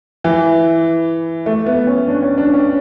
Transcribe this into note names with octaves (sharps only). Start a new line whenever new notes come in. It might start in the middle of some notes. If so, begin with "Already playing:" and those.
E3
A3
B3
C#4
D4
C#4
D4
C#4